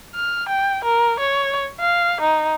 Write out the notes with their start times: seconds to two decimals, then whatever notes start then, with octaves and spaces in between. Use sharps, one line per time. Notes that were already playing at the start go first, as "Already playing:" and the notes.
0.15 F6
0.48 G5
0.84 A#4
1.19 C#5
1.80 F5
2.21 D#4